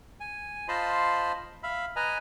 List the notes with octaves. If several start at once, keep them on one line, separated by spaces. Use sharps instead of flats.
G#5
F4 C5 D#5 A5 B5 C6
E5 F5 B5
B4 D#5 G#5 A#5